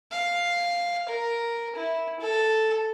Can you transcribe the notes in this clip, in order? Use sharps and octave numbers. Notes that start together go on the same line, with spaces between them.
F5
A#4
E4
A4